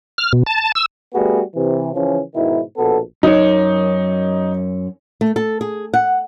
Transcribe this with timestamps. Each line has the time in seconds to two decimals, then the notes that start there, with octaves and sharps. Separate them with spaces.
0.18 F6
0.33 B2
0.47 A5
0.75 E6
1.14 G3 A3 B3 F#4 G#4
1.55 C3 E3
1.94 C#3 E3 F3 C#4
2.35 G#2 B2 D#3 E4
2.77 A#1 B2 B3 A4
3.23 F#2 D#4 C#5
5.21 A3
5.36 A4
5.61 G#4
5.94 F#5